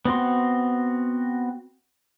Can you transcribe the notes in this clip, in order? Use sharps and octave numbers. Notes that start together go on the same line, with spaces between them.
B3 C4 F#4 C6